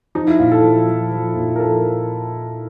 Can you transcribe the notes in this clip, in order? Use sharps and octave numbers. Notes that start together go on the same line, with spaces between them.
F3 D#4
E4
A#2 F4
A4
F3
F3
F3
A#2
A#4
F3 A4